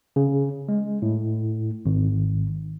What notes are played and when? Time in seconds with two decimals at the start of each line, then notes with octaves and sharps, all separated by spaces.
0.16 C#3
0.69 G#3
1.02 A2
1.86 G#1